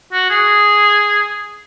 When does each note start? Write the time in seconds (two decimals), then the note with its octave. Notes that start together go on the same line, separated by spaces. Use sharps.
0.12 F#4
0.30 G#4